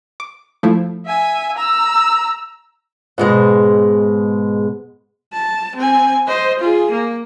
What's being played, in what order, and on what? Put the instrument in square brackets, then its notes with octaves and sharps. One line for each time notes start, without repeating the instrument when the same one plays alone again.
[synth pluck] D6
F3 A3 E4
[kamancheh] E5 G#5
A#5 E6
[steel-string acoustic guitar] G#2 B2 G#3
[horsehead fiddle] A5
C4 G#5
C5 D#5
F4 G#4
A#3